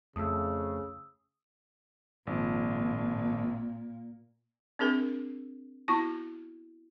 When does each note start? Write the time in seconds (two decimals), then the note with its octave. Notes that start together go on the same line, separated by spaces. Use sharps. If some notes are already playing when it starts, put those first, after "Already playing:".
0.16 F2 C#3 A3 D#6 E6
2.27 G#1 A#2 F3
4.79 C4 D4 G#4 A#4
5.88 B3 E4 F#4 C#6